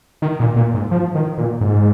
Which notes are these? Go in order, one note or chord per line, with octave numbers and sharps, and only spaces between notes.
D#3
A#2
A#2
G#2
F3
D#3
A#2
G#2